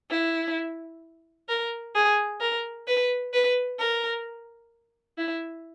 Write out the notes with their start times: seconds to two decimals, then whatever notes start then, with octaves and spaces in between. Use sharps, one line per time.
0.10 E4
1.49 A#4
1.95 G#4
2.41 A#4
2.87 B4
3.34 B4
3.79 A#4
5.18 E4